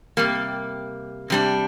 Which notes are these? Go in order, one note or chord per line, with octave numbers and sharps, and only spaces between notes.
C3 G3 A#3
C3 G3 D4